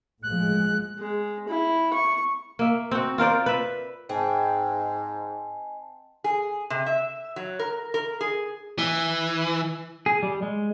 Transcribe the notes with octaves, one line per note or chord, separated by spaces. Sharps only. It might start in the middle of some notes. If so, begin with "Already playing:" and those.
A2 F3 G#3 F#6
G#3
E4
C#6
A#3 E5
C4 F#4
F4 A#4 C5 D5
B4 E5
G#2 C4 D#5 G#5 A5
G#4
C3
E5
F#3
A#4
A#4
G#4
E3
G#4
G3
G#3